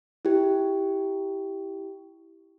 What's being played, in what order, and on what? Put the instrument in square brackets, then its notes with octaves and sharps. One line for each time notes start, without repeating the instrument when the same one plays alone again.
[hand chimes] E4 G4